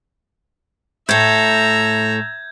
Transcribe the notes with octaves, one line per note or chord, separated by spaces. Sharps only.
A2 A4 E5 A#5 G6 G#6